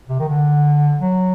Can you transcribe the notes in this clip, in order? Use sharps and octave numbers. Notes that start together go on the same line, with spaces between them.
C3
D#3
D3
F#3